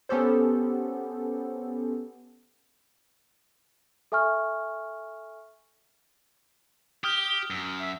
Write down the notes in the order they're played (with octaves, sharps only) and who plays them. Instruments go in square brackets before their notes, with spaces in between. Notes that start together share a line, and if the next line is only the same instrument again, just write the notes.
[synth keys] B3 C#4 G4 A4 C5
[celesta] A4 E5 G#5 C#6 F6
[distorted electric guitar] G4 [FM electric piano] D#6 F6 G6 [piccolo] G7
[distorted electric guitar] F#2 [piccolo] E6
[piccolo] E5